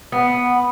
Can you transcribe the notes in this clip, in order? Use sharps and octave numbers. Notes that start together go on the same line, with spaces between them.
B3